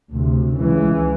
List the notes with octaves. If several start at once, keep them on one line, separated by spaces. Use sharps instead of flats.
D2 C3
C#2 C#3 E3